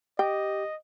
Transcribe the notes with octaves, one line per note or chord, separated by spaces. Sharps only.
G4 D#5 G5